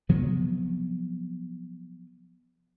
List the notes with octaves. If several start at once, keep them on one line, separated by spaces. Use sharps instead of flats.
C3 F3 F#3 B3